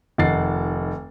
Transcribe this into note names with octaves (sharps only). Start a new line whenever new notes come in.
F1 D#3 F#5 A6 C7